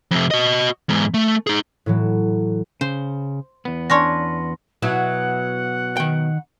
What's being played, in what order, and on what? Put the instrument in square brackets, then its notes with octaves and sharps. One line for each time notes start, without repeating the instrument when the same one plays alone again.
[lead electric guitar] F2 C3
F#4 D#5
E2 G#2
A3
D#4 G#4
[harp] A2 E3 F#3
[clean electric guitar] C#3 [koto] C5
[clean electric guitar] E2 B3
[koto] C#4 D4 C#5 [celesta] C6 A#6
[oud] B2 F#3 E4 [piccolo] F#5
[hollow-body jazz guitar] D#3 G5